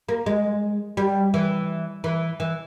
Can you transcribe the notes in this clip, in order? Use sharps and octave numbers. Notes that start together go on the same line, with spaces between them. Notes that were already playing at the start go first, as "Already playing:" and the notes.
A#3
G#3
G3
E3
E3
E3